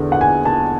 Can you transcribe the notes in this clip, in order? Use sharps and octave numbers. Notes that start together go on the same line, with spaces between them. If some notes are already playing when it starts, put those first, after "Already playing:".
Already playing: E2 D3
F#5
G#5
A5